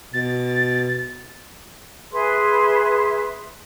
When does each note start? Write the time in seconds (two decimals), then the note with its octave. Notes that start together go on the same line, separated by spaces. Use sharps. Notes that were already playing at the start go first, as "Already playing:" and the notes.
0.13 B2 A6
2.12 G#4 B4 E5 C6